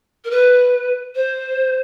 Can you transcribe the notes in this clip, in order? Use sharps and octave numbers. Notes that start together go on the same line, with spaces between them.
A#4
B4
C5